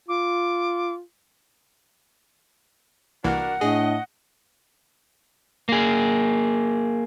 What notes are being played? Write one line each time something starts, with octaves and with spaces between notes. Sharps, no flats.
F4 D6
C2 E3 A#3 D4 F#4 A#4 F#5
A2 A3 D4 G#4 D#5
A#3 G#4